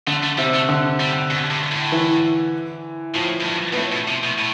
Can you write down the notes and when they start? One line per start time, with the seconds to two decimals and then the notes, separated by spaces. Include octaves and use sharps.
0.07 D3 A3
0.23 A3
0.37 C3 G3
0.53 A3
0.69 D3
1.00 G3
1.30 B2
1.50 G2
1.71 A2
1.92 E3
3.15 A2 F3
3.41 A2
3.46 G2
3.72 B2 B3
3.77 A2 A3
3.92 B2
4.08 C3
4.23 B2
4.39 A2